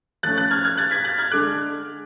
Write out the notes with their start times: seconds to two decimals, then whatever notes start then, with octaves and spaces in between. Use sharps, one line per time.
0.23 F3 A3 C#4 F#6 A6
0.37 F#6 A6
0.51 F6 G#6
0.64 F6 G#6
0.77 F#6 A6
0.91 G#6 B6
1.04 F#6 A6
1.18 F6 G#6
1.31 D3 G#3 D4 D6 F#6